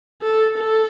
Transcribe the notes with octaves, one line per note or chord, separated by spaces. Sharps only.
A4
A4